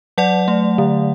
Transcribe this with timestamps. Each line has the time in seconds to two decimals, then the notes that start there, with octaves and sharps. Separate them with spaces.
0.18 F#3 D5 F#5
0.48 A3
0.78 D3